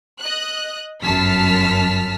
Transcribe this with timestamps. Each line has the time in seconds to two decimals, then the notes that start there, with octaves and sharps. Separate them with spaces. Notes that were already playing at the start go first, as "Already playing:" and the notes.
0.20 D#5 F#6
1.03 G1 F#2 A5 F6 B6